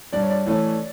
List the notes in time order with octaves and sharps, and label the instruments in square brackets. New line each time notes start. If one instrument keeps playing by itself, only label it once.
[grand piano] G2 [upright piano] D5
[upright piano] C#5
D5
[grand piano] E3 A3 C#4